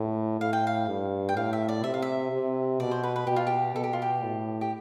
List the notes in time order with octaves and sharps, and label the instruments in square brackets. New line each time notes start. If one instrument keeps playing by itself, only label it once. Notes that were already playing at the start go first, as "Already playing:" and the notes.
Already playing: [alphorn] A2
[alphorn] A2 [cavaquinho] F5
[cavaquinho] G5
F5
[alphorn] G2
[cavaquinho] G5
[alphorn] A2 [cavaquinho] F5
[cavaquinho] E5
D5
[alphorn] C3 [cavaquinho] E5
[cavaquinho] F5
E5
[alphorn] C3
[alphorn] B2 [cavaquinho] D5
[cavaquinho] C5
B4
B4
[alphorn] B2 [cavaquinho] G4
[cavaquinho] F4
G4
[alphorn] B2 [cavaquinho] A4
[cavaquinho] G4
F4
G4
[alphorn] A2
[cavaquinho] G4